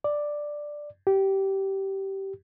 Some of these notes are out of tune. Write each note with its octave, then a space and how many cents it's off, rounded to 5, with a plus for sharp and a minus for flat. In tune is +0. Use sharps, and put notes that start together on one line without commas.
D5 +5
G4 -15